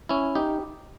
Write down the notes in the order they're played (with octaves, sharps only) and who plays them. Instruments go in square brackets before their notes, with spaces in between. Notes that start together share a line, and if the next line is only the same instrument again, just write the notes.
[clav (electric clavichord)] C#4 E4
D#4 G4